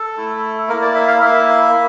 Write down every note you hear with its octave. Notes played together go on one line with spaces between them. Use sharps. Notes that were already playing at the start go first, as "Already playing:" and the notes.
Already playing: A4
A3 E4
A#3 E4 A#4
D5
E5
F5
A#3 E4 E5
A#3